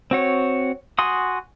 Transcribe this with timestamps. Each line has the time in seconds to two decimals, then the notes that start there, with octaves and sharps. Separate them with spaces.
0.11 C4 F#4 C#5
0.99 F#4 G#5 C6 D#6